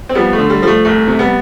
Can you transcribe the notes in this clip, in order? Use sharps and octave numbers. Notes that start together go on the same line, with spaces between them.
C4
F3 G3 B3
A3
D3
G3
F3 G3
A3
C2 A3
C3
G3 B3